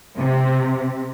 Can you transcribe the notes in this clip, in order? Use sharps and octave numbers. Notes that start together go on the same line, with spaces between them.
C3